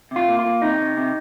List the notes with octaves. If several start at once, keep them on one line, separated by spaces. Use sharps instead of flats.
C3 F4
A#3
F4
A#3
C3 D#4
C3
C3